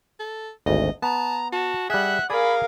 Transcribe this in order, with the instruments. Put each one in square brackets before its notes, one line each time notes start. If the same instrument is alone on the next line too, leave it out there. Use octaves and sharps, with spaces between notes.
[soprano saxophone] A4
[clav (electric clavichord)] G#1 D2 [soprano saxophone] D#5
[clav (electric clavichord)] B3 [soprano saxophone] A5 [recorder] A#5
[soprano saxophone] F#4 [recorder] A5
[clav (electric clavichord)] G3 G#4 [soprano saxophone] E5 [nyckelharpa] F#5 [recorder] F#6
[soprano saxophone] G#4 [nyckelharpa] A#4 F5 [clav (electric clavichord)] D5 G#5 [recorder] B5